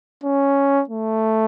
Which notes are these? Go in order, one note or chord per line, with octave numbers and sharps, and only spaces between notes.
C#4
A3